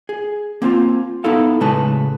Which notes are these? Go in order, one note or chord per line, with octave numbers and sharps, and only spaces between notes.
G#4
A#3 C4 D4 F4
B3 D#4 E4 A4 F5
A2 C#3 G#3 A3 B4 A5